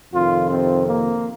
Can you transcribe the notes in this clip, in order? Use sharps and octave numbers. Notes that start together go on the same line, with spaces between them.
F2 C3 D#3 F4
C4
A#3